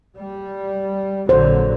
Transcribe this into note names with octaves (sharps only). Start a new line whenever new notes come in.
G3
A#1 D3 F#3 C5